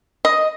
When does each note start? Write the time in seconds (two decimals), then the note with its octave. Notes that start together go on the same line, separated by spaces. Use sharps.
0.25 D#5